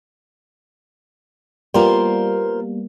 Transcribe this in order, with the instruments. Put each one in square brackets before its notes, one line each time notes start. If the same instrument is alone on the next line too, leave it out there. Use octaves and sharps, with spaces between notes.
[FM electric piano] G3 A#3 B3 [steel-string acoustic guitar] F4 A#4 C5